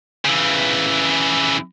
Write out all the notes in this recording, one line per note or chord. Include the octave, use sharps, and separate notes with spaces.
C#3 E3